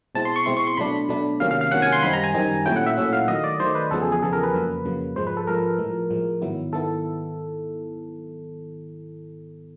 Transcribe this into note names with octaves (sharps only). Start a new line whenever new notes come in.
B2 G#3 C4 E4 A5
C6
C#6
B2 G#3 C4 E4 C6
C#6
C6
B2 F#3 A3 D4 B5
B2 F#3 A3 D4
C3 D#3 F#3 A#3 C#4 F5
F5
F5
C3 D#3 F#3 A#3 C#4 F#5
G#5
C6
F#2 D#3 G3 C4 D#4 B5
A#5
G#5
F#2 D#3 G3 C4 D#4
A#2 F#3 A3 C#4 E4 G5
F#5
E5
A#2 F#3 A3 C#4 E4
F5
D#3 F#3 A3 D#5
D5
D#3 F#3 A3 C5
B4
E2 C#3 F3 G#3 B3 A4
G#4
G#4
E2 C#3 F3 G#3 B3 A4
A#4
B4
F2 C#3 F#3 A#3
F2 C#3 F#3 A#3
G#2 F3 G#3 C5
B4
A4
G#2 F3 G#3 A#4
A2 F3 G#3
A2 F3 G#3
G#2 D#3 F#3 B3 E4
D#3 F#3 B3 E4 A4